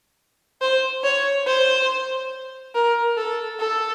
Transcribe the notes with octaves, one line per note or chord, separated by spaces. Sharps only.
C5
C#5
C5
A#4
A4
A4